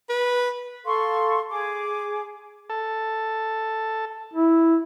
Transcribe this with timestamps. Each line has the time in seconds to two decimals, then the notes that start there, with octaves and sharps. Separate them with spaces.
0.09 B4
0.85 A4 F5 C6 C#6
1.49 G#4 D6
2.70 A4
4.33 E4